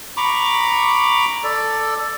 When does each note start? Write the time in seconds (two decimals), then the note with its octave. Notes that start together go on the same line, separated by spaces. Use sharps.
0.17 A#5 B5 C#6 D6
1.44 A4 D5